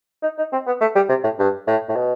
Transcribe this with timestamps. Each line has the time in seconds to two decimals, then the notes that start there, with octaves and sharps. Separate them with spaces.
0.23 D#4
0.38 D#4
0.53 C4
0.67 B3
0.81 A3
0.95 G3
1.09 C3
1.24 A2
1.39 G2
1.67 A2
1.89 A2
1.96 B2